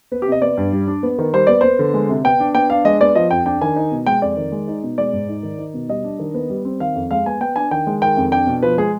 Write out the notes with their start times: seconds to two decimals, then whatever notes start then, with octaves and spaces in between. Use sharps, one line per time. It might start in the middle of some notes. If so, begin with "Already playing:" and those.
0.12 B3 B4
0.22 G4
0.27 C3 D#5
0.42 B3 D5
0.57 G2
0.73 G3
0.88 D4
1.03 B3
1.19 D#3
1.33 G3 C5
1.47 B3 D5
1.61 B3 C5
1.79 D3
1.94 G#3
2.09 C3
2.24 B3 G5
2.40 D4
2.55 B3 G5
2.70 D4 F5
2.85 G#3 D#5
3.01 B3 D5
3.15 F3 D#5
3.31 F2 G5
3.46 D4 G5
3.61 D#3 G#5
3.76 D#4
3.92 B2
4.06 G#3 G5
4.22 F2 D5
4.37 D#3
4.52 G#3
4.68 D#4
4.83 B2
4.98 G#3 D5
5.13 G#2
5.29 D#4
5.43 D#3
5.59 D#4
5.74 B2
5.89 G3 D#5
6.04 D4
6.19 D#3
6.34 B3
6.50 G3
6.65 C4
6.80 D#3 F5
6.95 F2
7.11 G#3 F5
7.26 B3 G#5
7.41 B3 G5
7.56 D4 G#5
7.71 D#3 G5
7.87 G#3
8.02 D#3 G5
8.17 F2
8.32 D4 G5
8.47 B2
8.63 F3 B4
8.78 G#3 G#4